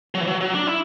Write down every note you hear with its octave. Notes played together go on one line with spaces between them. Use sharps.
F#3
E3
F#3
F#3
D4
E4